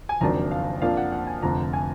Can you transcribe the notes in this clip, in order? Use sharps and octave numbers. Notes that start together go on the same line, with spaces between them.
G#5
F#1 F2 D#3 F#3 D4 A#5
F5
F2 F3 A#3 D4 F5
F#5
F#5
G#5
F1 F2 D3 A#5
G#5